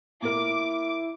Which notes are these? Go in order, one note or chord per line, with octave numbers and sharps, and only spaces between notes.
A#2 E4 A#4 D6